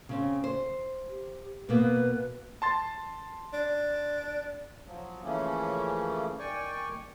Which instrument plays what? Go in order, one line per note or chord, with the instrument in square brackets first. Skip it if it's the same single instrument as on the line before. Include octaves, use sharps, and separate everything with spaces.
[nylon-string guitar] C#3 C4 C#4
C5
[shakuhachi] G4
[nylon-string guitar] B2 A#3 B3 [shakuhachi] B4
[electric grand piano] A5 C6 A6
[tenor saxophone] D4
[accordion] F3 F#3
C#3 E3 F3 A3 A#3 C#4
D#3 D5 G5 G#5 C#6